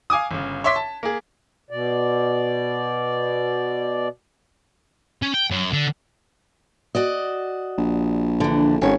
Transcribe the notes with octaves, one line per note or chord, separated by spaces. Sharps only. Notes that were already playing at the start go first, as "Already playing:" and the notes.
F5 G#5 D6 D#6
G1 C#3
C#5 E5 C6 D6 B6
A5
A#3 G#4
B2 D5
C#4
G5
F#2
D3
F#4 D5 D#5
A#1
D3 E3
G#1 C#4 C#5